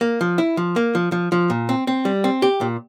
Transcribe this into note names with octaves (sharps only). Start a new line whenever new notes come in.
A#3
F3
E4
F3
A#3
F3
F3
F3
A#2
C4
C4
G3
C4
G4
A#2